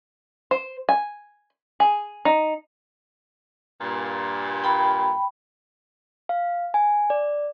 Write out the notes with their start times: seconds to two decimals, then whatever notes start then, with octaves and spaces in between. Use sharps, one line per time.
0.51 C5
0.89 G#5
1.80 G#4
2.25 D#4
3.81 G2 A#2
4.64 G5 B5
6.29 F5
6.74 G#5
7.10 D5